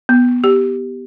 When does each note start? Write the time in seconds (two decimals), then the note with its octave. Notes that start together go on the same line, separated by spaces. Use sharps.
0.09 B3
0.44 G4